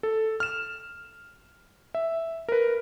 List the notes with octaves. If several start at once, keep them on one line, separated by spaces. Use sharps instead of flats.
A4
F6 E7
E5
A#4 B4